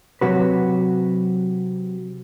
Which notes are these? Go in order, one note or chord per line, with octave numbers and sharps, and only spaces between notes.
C3 F#3 F#4 B4